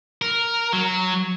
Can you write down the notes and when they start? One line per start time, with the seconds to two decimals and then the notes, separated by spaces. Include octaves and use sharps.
0.22 A#4
0.73 F#3